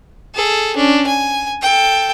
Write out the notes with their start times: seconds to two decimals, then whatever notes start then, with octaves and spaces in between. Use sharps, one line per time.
0.35 G#4 A4
0.76 C#4 D4
1.07 G#5
1.62 A4 G5